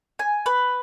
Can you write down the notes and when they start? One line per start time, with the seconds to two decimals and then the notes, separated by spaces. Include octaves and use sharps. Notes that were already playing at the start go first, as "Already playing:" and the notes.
0.19 G#5
0.46 B4